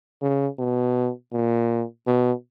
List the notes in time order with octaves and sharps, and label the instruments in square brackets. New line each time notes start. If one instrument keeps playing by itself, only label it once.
[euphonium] C#3
B2
A#2
B2